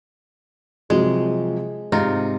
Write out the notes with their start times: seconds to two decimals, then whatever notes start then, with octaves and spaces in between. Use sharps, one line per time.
0.90 C3 F3 F#3 G#3
1.92 G#2 C3 D#4 F4